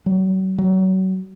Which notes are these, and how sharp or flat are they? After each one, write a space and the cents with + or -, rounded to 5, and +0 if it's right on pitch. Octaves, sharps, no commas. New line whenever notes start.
F#3 +40
F#3 +30